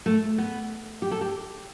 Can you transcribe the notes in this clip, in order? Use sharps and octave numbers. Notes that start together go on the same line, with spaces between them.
A3
B3
G4
A4
G4